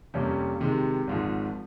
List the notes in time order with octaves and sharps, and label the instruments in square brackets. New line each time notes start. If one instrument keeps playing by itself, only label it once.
[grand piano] F2 C3 G3 A#3 C#4
C3 D#3 G#3
G#1 G#2 F3